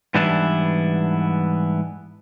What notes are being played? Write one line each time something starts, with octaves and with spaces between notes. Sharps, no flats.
G#2 E3 G3 B3 D4 E4